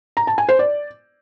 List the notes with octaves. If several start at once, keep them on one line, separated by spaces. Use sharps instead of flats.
A#5
A5
G#5
C5
D5